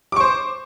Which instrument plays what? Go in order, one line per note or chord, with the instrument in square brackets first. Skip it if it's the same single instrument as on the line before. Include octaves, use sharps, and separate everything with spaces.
[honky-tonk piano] D6
C#6
C5